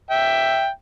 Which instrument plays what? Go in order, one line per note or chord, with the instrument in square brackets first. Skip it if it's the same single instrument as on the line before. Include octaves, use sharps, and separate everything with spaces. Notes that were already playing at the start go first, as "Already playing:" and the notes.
[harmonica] E5 G5